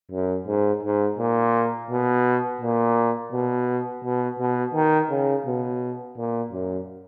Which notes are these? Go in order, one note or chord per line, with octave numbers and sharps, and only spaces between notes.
F#2
G#2
G#2
A#2
B2
A#2
B2
B2
B2
D#3
C#3
B2
A#2
F#2